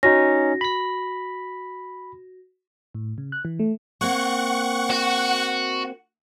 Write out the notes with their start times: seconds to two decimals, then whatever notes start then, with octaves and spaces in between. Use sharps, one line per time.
0.03 C#4 D#4 F#4 A#6
0.61 B5 B6
2.95 A2
3.18 C#3
3.32 F#6
3.45 E3
3.59 A3
4.01 A#3 C4 F#5 C#6
4.90 F#4